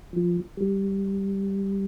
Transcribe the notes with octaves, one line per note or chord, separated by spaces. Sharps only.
F3
G3